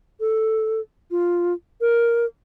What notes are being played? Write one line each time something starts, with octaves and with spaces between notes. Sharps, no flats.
A4
F4
A#4